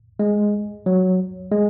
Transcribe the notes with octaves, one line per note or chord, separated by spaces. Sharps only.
G#3
F#3
G#3